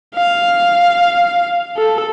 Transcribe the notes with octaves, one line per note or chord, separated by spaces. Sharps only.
F5
A4